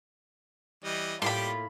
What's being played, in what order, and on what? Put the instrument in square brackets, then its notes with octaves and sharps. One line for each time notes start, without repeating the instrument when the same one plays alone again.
[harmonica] E3 G3 [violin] D#5
[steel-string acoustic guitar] A2 A#3 [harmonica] G3 G4 [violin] F4 [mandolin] B5 C6